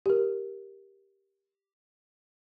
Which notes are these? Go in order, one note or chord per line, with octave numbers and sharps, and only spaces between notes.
G4 A#4